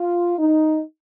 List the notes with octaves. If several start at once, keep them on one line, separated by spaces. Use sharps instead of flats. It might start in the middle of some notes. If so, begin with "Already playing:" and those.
Already playing: F4
D#4